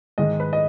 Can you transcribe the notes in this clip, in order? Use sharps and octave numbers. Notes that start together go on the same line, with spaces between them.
G#2 D#3 G#3 D#5
B4
D#5